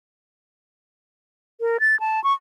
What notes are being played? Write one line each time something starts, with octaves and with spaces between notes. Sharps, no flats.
A#4
A6
A5
C#6